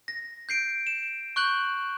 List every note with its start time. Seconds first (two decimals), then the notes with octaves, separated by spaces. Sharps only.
0.08 A#6
0.49 G6 C7 D7
0.87 E7
1.36 C#6 F#6 G6 F#7